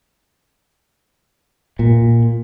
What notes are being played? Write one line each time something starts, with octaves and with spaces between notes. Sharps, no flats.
A#2